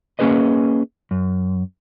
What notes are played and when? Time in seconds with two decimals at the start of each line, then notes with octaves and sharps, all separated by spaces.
0.19 A#3 C#4 G#4 B4 D#5
1.11 F#2